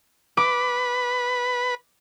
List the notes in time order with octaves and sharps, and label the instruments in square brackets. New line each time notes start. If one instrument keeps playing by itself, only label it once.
[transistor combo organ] B4 [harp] D6